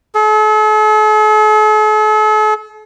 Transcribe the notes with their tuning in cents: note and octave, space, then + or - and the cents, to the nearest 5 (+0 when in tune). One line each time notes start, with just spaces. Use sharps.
A4 -45